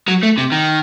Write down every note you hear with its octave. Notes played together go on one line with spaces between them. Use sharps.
F#3
A3
C3
D#3